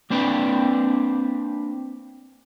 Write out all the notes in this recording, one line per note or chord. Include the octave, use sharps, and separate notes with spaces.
A#3 C4 D4 B4 G5